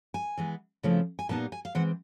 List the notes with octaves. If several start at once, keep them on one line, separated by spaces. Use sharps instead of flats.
G#5
E3 G#3 B3
C#3 F3 A3 C4 E4
G#5
A#2 G3 B3 D#4 A5
G#5
F5
E3 G#3 C4 F#5